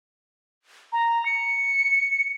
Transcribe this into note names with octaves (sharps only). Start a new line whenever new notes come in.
A#5
C#7